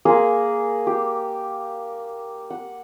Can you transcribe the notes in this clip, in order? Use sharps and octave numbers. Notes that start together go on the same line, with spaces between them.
A#3 G#4 G#5 C6
G4
F#5